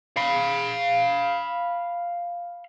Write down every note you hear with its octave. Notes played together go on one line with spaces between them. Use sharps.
F5 B5